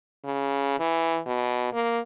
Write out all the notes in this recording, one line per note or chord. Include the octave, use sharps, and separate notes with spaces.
C#3
E3
B2
A#3